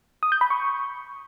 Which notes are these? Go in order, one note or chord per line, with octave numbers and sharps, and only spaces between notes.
D#6
G6
B5
C#6